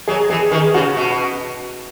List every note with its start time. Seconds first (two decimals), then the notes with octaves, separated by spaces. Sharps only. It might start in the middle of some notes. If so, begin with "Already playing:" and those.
0.08 F#3 G#4
0.30 E3 G#4
0.51 D#3 G#4
0.74 C#3 F#4
0.96 B2